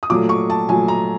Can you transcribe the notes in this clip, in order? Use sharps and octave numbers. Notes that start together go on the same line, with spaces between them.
D#6
A#2 F#3 A3 D6
C#6
A5
A#2 F#3 A3 G#5
A#5